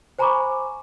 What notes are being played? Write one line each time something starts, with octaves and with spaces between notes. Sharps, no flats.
C5 G#5 A#5 B5 C#6 D6